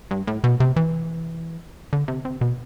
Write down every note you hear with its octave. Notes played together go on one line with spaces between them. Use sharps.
G2
A2
B2
C3
E3
D3
C3
C3
B2